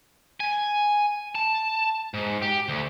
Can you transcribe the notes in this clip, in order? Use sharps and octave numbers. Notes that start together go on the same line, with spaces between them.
G#5
A5
G#2
G4
D2